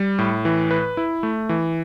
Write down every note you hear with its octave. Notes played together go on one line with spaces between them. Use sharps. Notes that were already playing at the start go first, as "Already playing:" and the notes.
Already playing: G3
A2
E3
B4
E4
A3
E3